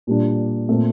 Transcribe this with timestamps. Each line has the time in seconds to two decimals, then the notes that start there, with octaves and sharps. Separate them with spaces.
0.07 A#2 G3 D4
0.68 A#2 A3 C4